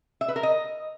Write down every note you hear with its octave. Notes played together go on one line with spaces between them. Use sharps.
E5
B4
A#4
D#5